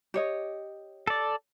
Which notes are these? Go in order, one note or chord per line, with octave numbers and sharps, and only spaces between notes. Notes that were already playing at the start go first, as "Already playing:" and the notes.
G4 C#5 D#5
A4 D5